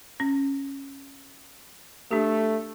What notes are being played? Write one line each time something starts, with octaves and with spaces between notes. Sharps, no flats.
C#4
A3 D4 G4